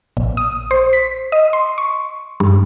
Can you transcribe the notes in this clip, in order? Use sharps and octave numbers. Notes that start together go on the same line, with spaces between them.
A#1
D#6
C5
B6
D#5
C6
C#6
G2